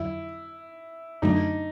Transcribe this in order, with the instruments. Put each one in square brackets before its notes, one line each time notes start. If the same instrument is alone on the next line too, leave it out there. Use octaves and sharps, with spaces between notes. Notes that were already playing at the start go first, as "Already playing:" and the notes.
Already playing: [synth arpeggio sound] F2 D3 F#3 [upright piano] E4
[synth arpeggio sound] F#2 D3 F#3 A3 D4 [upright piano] D#4